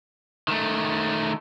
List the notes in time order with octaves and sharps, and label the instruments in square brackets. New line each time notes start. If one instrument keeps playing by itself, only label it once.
[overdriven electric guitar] D#3 A3